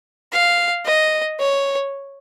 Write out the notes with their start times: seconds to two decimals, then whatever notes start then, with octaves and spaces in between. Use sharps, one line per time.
0.33 F5
0.86 D#5
1.39 C#5